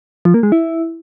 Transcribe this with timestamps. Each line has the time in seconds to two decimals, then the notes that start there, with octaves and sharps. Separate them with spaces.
0.25 F3
0.34 A#3
0.43 G#3
0.52 E4